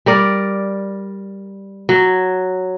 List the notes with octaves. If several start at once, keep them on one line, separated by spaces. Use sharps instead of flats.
G3 A#4 D5
F#3